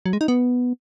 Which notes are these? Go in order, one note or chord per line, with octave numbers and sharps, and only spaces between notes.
F#3
G#3
D#4
B3